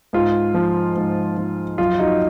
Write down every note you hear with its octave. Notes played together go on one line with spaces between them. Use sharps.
G#2 F4
F3
G#2
F3
F#2 F4
D#4 F#4